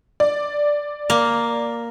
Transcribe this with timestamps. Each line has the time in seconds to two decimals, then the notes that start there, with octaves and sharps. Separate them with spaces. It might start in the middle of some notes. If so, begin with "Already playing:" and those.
0.20 D5
1.10 A#3